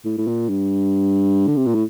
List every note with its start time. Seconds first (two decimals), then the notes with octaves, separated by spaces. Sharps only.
0.05 A2
0.18 A2
0.27 A#2
0.49 G2
1.47 D3
1.56 C3
1.66 A#2
1.75 A2